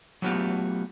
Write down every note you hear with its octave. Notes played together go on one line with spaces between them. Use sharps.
F#3 A3 B3 F4 G4